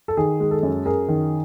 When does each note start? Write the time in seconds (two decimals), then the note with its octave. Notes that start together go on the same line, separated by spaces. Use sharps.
0.08 A4
0.17 D#3 G#4
0.40 G#3
0.51 A4
0.63 F#2
0.86 F#2 G#4 A#4
1.08 D#3